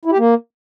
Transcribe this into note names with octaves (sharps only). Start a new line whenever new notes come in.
E4
G4
A#3